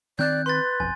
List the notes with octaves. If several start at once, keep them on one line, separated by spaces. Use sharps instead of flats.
D#3 C4 D5 F#6 G6
B4 C6 A6
F#1 B1 F2 G#5